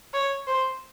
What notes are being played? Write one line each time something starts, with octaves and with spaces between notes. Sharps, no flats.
C#5
C5